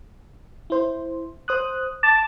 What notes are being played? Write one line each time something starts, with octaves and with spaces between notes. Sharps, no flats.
E4 C5
C5 D#6 F#6
A5 D6